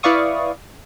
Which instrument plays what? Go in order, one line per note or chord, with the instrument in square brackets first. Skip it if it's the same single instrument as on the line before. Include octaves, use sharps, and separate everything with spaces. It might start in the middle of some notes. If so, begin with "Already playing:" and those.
[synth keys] E4 B4 D5 F5 C#6 D#6